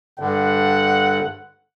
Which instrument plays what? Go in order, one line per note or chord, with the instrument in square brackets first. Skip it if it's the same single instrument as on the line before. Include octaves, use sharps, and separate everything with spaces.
[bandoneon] G2 D3 [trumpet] F#5